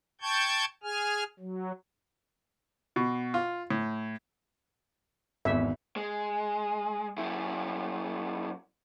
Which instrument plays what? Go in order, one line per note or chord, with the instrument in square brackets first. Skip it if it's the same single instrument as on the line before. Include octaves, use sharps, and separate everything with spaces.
[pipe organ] G5 A5 C#6 G6 G#6
G#4 G#5 F6
F#3
[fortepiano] B2
F4
A2
[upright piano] G#1 E2 [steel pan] E5
[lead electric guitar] G#3
F#2 E4